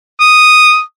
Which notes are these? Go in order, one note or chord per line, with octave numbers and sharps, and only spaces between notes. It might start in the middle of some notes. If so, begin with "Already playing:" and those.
D#6